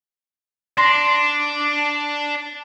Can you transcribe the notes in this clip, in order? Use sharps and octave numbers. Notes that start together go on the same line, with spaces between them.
D4 C6 A#6 C7